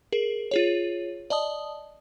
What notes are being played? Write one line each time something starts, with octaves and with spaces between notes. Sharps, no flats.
G#4 A#4
F4 G#4 C#5
D5 D#5 A5 D#6